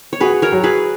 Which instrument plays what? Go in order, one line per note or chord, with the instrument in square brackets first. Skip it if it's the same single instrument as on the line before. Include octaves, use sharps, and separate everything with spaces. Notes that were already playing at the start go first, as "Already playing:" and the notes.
[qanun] C#5
[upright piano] F#4 [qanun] G#4 B4
[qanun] A#4 C#5
[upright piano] F#3
[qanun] G#4 B4